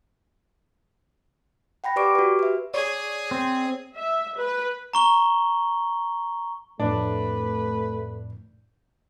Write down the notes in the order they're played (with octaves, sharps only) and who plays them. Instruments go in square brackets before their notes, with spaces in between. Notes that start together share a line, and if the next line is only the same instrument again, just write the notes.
[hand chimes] F#5 G5 B5 A#6
G4 B4 D5 C#6 D6 D7
F#4 G4 B4
B4 E5
[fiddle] G#4 [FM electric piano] C#5 D5
[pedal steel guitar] C4
[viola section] E5
B4
[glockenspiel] A#5 C#6 G7
[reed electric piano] F2 A2 [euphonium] A3 [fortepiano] D4 [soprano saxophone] B4